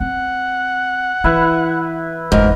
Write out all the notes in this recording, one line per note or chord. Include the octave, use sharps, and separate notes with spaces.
C4 F#5
E3 E4 B4
F#1 E2 G#2 A#4